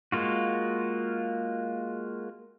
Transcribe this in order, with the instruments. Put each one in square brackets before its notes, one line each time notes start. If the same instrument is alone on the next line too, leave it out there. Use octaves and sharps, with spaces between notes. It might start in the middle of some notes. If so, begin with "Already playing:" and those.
[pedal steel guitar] G#3 A#3 F4 F#4